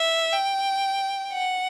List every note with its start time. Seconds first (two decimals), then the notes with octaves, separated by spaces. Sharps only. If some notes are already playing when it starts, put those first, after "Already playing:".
Already playing: E5
0.33 G5
1.33 F#5